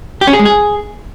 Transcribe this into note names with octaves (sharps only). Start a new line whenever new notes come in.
G4
C#4
G#4
G#3
G#4